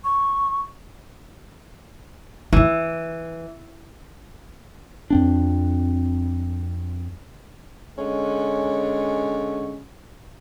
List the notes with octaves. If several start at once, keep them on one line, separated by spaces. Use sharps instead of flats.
C#6
E3 D#4 E4
F2 C4 D4
D3 G#3 C#4